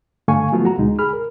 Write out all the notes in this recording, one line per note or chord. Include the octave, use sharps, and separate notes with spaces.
G2 D3 A3 F5 G#5 C#6
F3 F#3 A3 B3 F4 F#4
F#4 A#5
D2 B2 G#3 D#4
G#4 B5 F6
A#4